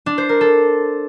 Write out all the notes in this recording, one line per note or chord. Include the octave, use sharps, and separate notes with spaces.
D4
C5
A#4
A4